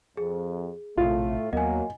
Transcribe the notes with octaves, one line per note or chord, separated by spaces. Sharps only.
F2 G#4
A#1 A2 C3 A3 F4
D#2 F#3 A#3 B3 D#5 G#5